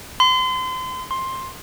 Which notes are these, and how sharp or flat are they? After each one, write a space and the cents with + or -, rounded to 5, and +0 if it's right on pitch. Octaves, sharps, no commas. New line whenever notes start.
C6 -35
C6 +10